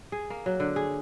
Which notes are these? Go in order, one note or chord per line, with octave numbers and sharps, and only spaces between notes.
G#4
A#3
F#3
D3
G#4